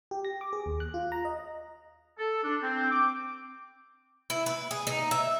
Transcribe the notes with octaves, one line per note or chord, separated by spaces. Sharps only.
G4
A#6
D6
G#4
D#2
F#6
F4
A#5
D#5
A4
D4
C4
D6
E4
B4
G#4
D#4
E5